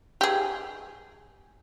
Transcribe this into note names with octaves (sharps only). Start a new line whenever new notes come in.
G4 G#4